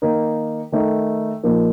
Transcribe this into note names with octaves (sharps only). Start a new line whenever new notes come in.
D#3 A#3 D#4
D#3 A3 D#4
A#2 F3 A#3 D#4